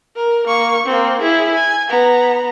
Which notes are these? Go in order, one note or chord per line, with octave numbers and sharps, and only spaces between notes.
A#4
A#3 C#6
A#3 C4
E4 G#4
G#5
B3 A#5